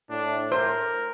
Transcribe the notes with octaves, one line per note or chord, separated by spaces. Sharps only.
A2 D4
A#4 C5